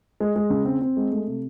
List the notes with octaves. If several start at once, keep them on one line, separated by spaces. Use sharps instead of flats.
G#3
G#3
C#3
C4
C4
G#3
A3
C3